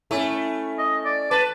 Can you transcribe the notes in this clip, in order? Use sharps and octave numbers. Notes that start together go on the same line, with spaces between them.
A3 C#4 E4
D#5
D5
B4 A5